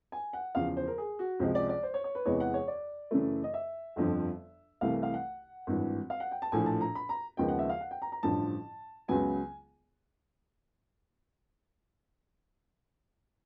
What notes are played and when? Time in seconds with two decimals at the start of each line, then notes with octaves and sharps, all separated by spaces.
0.12 G#5
0.33 F#5
0.55 E2 C#3 F3 F5
0.77 C5
0.87 A#4
0.98 G#4
1.19 F#4
1.40 C#2 C3 F3 G#3 C5
1.55 D5
1.69 D5
1.83 C5
1.94 C#5
2.04 C#5
2.15 B4
2.25 E2 C3 E3 G#3 B3 C#5
2.40 F#5
2.54 C#5
2.68 D5
3.11 F#2 C#3 E3 A3
3.44 D#5
3.54 E5
3.96 G1 F2 D3 F3
4.81 C2 C3 E3 A3 F5
5.03 F5
5.14 F#5
5.67 G#1 G2 E3
6.10 F5
6.20 F#5
6.31 G5
6.42 A5
6.52 A#1 A2 F3 G#5
6.66 A5
6.81 A#5
6.95 B5
7.09 A#5
7.37 D#2 C#3 F3 G#3 B3 G5
7.49 F#5
7.59 E5
7.69 F5
7.80 F#5
7.91 G5
8.02 A#5
8.12 A#5
8.23 A1 G2 D3 F3 A5
9.08 C#2 C#3 F#3 B3 G#5